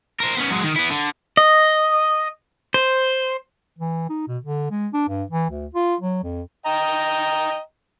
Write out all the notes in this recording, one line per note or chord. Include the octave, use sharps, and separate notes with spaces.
A#4 C5
B3 C#4
F#3 G#3
D#3
B3 E4
D3
D#5
C5
E3
D#4
B2
D3
G#3
D4
G2
E3
D2
F4
F#3
F2
D#5 G5 A#5